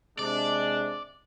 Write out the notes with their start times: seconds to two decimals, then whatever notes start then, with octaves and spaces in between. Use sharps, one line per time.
0.19 C3 G#3 D4 D5